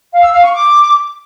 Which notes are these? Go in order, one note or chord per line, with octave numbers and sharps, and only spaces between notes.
F5
E6
F5
C#6
D6